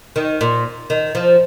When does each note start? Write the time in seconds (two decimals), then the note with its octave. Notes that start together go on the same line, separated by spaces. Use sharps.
0.16 D#3
0.41 A#2
0.90 D#3
1.15 F3